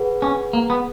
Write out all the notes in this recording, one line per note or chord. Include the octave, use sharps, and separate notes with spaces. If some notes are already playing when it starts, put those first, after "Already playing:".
Already playing: G#4 B4 F#5
C#4
A#3
B3